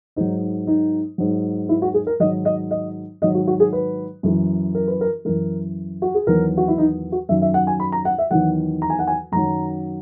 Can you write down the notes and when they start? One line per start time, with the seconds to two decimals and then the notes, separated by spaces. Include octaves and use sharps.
0.16 G#2 F#3 D#4
0.67 D#4
1.18 G#2 F#3
1.69 E4
1.82 F#4
1.94 G#4
2.07 A#4
2.20 G#2 D#3 F#3 D#5
2.45 D#5
2.71 D#5
3.22 G#2 D#3 F#3 D#5
3.35 F#4
3.47 F#4
3.60 G#4
3.73 B4
4.23 F#2 E3
4.75 A#4
4.88 B4
5.01 A#4
5.25 F#2 E3 A#4
6.02 F#4
6.14 G#4
6.27 E2 D#3 F#3 A#4
6.57 F#4
6.68 E4
6.78 D#4
7.12 F#4
7.29 F#2 D#3 F#3 E5
7.42 E5
7.54 F#5
7.67 G#5
7.80 B5
7.92 A#5
8.05 F#5
8.18 E5
8.31 E2 D#3 F#3 F#5
8.82 A#5
8.90 G#5
8.99 F#5
9.07 G#5
9.32 F#2 D#3 F#3 A#5